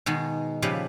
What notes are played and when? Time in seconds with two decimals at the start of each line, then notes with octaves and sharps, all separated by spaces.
0.06 B2 D#3 G#3
0.62 A#2 C#3 F3 G4 B4